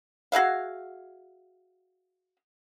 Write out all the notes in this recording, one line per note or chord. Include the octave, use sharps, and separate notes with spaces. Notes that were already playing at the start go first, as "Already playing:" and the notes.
F#4 G#4 E5 F5